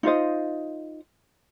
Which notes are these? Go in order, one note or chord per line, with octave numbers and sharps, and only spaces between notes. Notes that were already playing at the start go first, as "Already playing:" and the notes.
D#4 F4 C5 D#5